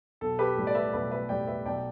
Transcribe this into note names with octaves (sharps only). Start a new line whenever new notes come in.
B1 A4
G4 B4
A2 G3
D5
B4 E5
B1 B4 E5
B4 E5
A2 G3 D5 G5
B4 E5
B1 D5 G5